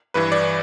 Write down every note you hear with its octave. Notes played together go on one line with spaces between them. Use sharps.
G2 E3 B4
D5